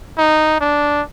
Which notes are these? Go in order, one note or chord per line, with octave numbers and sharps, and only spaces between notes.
D#4
D4